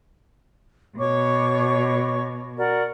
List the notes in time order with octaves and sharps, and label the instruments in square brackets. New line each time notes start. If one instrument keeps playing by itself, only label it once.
[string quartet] B2 [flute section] C#5 C#6 D6
[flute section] F#4 A#4 D5